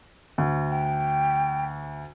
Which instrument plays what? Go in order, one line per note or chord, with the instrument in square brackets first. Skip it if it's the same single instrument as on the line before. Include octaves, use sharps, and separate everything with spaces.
[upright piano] D2
[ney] G5